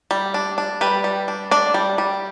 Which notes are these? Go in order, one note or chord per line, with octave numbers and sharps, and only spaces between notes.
G3
D4
D4
G3 B4
G3
D4
D4 D5
G3
G3